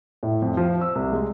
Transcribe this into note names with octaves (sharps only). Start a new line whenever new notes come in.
A2
F2
F3
E6
C2
G#3